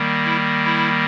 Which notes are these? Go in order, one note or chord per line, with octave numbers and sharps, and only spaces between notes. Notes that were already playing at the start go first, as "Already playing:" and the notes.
Already playing: D#3 G3 A#3
E4
E4